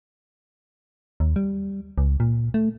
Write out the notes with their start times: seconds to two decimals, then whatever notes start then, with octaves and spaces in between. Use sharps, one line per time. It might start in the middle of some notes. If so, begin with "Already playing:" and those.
1.20 D#2
1.36 G3
1.98 C#2
2.20 A#2
2.54 A3